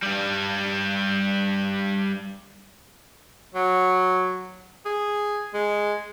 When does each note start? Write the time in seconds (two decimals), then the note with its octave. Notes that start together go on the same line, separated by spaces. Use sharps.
0.02 G2 G3
3.54 F#3
4.85 G#4
5.54 G#3